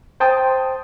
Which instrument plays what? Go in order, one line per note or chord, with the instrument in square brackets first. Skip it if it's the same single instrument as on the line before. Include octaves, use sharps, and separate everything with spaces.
[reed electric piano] C5 G5 A5 D#6